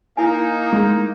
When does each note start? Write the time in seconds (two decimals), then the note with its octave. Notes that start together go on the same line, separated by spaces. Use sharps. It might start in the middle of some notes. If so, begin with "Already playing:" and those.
0.17 A#3 D#4 E4 G#5
0.73 G#3